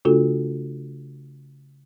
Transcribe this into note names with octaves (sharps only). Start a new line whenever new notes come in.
C#3 A3 D4 F4 F#4 A4